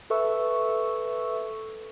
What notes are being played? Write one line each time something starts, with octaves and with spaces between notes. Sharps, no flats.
A4 B4 E5 C#6 E6